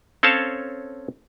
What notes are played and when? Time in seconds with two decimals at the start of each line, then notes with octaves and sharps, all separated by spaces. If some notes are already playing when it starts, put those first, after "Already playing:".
0.23 C4 C#4 A4 C#5 F5 A5